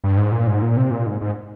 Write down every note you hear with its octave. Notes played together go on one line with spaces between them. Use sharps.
G2
G#2
A#2
G#2
A#2
C3
A#2
G#2
G#2